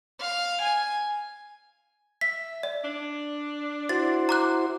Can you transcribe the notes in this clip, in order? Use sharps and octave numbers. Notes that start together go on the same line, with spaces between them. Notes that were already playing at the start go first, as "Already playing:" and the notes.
F5
G#5
E5 B6
D5
D4
E4 F#4 C5 A6
A#5 D6 F#6